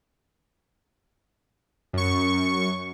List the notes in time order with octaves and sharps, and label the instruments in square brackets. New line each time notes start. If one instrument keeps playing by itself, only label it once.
[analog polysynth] F#2 C#6